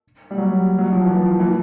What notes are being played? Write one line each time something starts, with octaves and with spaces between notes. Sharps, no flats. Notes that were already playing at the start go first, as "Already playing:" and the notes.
G3
F#3
F#3
F3
E3
F3
E3